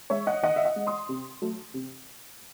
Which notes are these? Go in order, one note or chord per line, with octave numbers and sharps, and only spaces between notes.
G#3 C#5 E5
D#5 F#5
D#3 D#5 F#5
E5
D#5 F#5
G#3
C6 D#6
C3
F#3 A3
C3